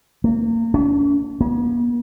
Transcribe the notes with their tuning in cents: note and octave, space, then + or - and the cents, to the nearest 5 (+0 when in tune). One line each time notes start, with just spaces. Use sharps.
A#3 -30
C#4 +45
A#3 +45